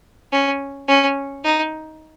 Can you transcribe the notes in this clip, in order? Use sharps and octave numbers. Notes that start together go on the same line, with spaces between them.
C#4
C#4
D#4